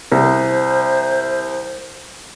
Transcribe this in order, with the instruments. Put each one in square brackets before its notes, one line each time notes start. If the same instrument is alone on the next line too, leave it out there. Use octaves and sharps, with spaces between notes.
[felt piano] C2 [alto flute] C5